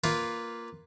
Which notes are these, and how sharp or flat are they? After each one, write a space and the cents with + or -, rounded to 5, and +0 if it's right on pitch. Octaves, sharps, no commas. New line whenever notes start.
A#3 +0 F4 +0 B4 +0